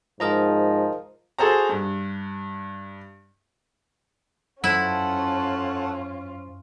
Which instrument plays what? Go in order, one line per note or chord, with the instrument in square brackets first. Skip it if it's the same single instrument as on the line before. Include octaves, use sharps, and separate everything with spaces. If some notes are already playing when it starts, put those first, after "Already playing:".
[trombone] G#2 [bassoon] F3 [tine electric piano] A#4 D#5 A#5
[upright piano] F#4 G#4 A4 C5 A#5
G2
[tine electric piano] F#2 C5 [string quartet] C#4 F4 [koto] E4 [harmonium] A4 F#5